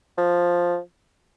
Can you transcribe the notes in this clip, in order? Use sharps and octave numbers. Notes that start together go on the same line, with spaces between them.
F3